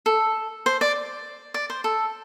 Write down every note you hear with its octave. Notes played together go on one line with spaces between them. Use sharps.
A4
C5
D5
D5
C5
A4